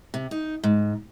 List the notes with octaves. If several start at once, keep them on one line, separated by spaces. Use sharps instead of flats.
C3
D#4
G#2